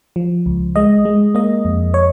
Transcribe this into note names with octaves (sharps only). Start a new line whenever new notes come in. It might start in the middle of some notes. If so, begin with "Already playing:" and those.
F3
C#2
G#3 D#5
G#3
A#3 D#5
F2
C#5